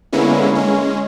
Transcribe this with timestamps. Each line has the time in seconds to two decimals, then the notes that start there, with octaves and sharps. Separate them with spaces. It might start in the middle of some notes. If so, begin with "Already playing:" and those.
0.13 D3 G#3 A#3 B3 C#4 E4
0.55 G#3 C#4